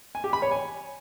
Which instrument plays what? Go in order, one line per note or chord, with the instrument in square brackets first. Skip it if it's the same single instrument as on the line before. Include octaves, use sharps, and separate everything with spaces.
[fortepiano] G#5
G4
B5
C#5
G#5